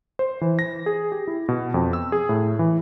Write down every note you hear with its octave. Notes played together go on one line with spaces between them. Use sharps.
C5
E3
A#6
G#4
G4
E4
B2
F2
E6
G#4
A2
E3